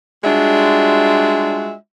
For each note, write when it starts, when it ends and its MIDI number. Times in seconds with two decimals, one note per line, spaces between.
0.24 1.73 55
0.24 1.73 56
0.24 1.73 62
0.24 1.73 65
0.24 1.73 66
0.24 1.73 76